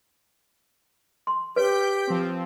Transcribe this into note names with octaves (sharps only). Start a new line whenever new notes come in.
C6
G4 B4 C#5 G6 B6 D7
F3 C4